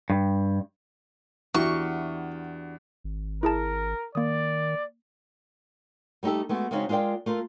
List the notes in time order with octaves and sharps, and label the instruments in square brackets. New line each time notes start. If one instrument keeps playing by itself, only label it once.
[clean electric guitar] G2
[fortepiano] E2 [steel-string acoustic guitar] D4 F#4 G4 [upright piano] E4 [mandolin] C#6
[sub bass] G#1
[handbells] E4 G#4 A5 [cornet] A#4
[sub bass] D#3 [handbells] A#3 D#6 [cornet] D5
[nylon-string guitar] G3 A3 D#4 G4 A4
G#3 A3 B3 F#4
C#3 G#3 C4 C#4 D#4 F#4
G#3 F4 A#4 D5 G5
A3 F4 A#4